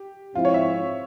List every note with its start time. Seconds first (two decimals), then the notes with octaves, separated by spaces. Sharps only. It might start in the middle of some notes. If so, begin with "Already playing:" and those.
Already playing: G4
0.34 G#2 F3 C4 E4 F4
0.45 C#5
0.54 E5